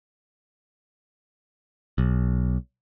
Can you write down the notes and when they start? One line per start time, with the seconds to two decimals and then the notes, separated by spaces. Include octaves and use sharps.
1.98 B1